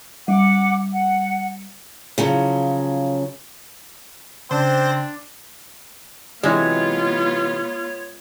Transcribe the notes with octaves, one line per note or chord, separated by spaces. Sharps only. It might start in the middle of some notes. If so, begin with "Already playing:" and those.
G3 F#5 D6
F#5
C#3 F3 F#3
C#3 C4 D4 C5
C3 E3 F#3 G#3 B3 F4 C#5